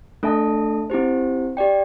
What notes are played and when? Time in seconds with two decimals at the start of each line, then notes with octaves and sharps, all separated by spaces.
0.23 A3 D4 A4 E5 A5
0.90 C4 E4 G4 C5
1.57 G4 D5 G5